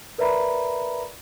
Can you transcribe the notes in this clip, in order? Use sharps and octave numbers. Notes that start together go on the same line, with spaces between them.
A#4 B4 D5 E5 A#5 B5